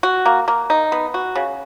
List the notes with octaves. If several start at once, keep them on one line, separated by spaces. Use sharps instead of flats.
F#4
A#3
A#3
D#4
B3
F#4
C#3